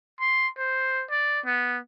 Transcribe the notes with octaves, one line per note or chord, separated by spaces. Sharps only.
C6
C5
D5
B3